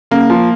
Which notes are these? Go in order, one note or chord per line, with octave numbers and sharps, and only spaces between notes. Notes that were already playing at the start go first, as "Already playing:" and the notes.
C#3 A#3
F3